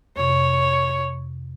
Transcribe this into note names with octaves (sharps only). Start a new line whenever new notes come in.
F2 C3 C#5